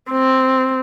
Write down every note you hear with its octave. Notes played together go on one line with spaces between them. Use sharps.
C4